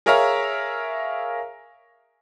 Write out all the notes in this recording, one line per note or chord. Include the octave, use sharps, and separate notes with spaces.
G#4 A#4 C#5 E5 F5 A#5